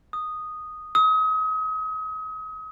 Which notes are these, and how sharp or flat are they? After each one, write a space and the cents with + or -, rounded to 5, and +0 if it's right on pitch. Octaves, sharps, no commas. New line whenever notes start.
D#6 -5
D#6 +35